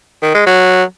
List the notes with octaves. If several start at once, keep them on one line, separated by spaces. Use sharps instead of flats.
D#3
G#3
F#3